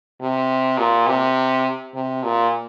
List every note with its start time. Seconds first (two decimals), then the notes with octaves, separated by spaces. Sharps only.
0.21 C3
0.78 A#2
1.07 C3
1.95 C3
2.24 A#2